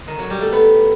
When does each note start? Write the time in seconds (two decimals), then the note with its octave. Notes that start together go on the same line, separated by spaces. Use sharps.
0.07 D#3 D#4
0.19 F#3 F#4
0.30 G3 G4
0.41 A3 A4
0.52 B3 B4